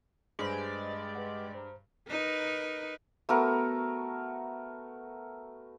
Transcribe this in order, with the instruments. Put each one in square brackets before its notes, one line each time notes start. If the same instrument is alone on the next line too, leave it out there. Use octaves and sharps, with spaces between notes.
[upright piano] G2 [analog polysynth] G#3 G4 D5 [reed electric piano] G#4 B4 C5
[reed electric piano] B4 D#5 F#5
C5 A#5
[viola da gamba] D#4 A#4 B4
[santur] A3 B3 F#4 A#4